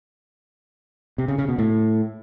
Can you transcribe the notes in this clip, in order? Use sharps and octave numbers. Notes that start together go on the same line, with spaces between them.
C3
C#3
C#3
B2
A2